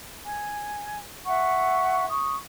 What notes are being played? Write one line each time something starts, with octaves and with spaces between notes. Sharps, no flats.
G#5
E5 F#5 C#6
C#6 D#6